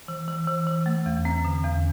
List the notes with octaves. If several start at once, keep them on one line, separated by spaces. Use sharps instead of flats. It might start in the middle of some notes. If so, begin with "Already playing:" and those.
E3
E3
E3
E3
A3
E2
C4
D3
E2